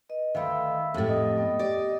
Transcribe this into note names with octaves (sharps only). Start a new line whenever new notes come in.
B4 D#5
D2 D#3 E5 F5 B5
F2 A2 G4 A4
D#5
B3 G5
G4 D5